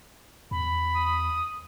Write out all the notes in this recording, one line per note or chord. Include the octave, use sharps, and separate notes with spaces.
E2 B5
D#6